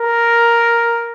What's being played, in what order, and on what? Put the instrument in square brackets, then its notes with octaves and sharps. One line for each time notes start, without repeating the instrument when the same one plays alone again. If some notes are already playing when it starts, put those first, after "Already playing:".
Already playing: [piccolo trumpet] A#4